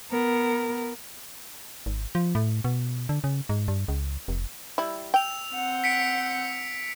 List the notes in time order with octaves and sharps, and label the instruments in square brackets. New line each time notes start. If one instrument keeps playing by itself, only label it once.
[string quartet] B3 A#4
[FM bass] G#1
F3
A2
B2
D3
C#3
G#2
G2
C#2
F1
[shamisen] G3 E4
[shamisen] G5 [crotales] E6 F7
[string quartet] C4 F#5 G6
[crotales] B6 C#7 D7